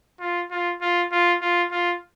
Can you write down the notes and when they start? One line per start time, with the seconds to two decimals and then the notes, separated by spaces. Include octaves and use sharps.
0.20 F4
0.51 F4
0.81 F4
1.12 F4
1.42 F4
1.71 F4